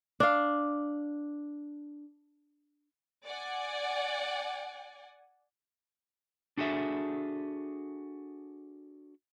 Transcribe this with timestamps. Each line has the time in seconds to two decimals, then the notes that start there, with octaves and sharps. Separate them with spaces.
0.20 D4 F5
3.25 D5 F#5 G#5
6.58 D4 F#4 G#4 A4 E5